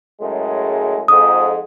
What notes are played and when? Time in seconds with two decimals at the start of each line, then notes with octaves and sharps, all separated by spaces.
0.20 F#2 A2 G#3
1.08 F2 G#2 D#6